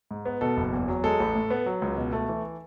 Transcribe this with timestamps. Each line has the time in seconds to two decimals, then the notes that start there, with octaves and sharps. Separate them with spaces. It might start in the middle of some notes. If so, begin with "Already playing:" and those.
0.11 G#2
0.25 B3
0.41 B2 A4
0.57 F#1
0.73 E2
0.88 F#3
1.04 G#3 A4
1.20 A1
1.35 A2
1.50 B3
1.66 F#3
1.82 C#2
1.97 B2
2.13 A3
2.29 E3